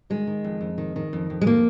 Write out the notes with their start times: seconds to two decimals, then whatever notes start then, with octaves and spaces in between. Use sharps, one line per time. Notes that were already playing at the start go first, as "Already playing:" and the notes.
0.10 D#3 G#3
0.27 D#3
0.44 F2
0.61 F2
0.78 D#3
0.96 D#3
1.13 F2
1.30 F2
1.41 G#3
1.46 D#3 A#3